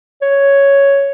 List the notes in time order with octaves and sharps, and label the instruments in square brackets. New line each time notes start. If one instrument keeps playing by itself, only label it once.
[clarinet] C#5